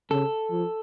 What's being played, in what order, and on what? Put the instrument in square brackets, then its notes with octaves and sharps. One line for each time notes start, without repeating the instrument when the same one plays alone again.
[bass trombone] C#3 [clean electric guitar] A4
[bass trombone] F3